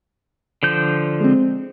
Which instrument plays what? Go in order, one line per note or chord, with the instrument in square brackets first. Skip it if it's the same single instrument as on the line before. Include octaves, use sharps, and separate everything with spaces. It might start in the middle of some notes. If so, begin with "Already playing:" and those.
[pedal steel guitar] D3 F3 G6
[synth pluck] G#3 C4